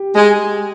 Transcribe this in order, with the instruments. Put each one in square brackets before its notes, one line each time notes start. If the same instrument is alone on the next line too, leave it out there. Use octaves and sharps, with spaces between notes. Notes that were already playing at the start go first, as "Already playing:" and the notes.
Already playing: [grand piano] G4
[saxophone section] G#3